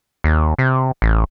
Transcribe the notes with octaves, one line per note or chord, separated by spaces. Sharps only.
D#2
C3
A1